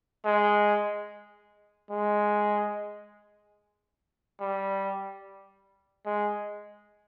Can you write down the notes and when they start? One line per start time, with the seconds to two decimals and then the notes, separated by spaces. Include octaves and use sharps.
0.25 G#3
1.90 G#3
4.40 G3
6.06 G#3